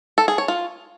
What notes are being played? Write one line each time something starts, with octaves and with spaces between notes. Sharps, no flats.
A4
G#4
C#5
F4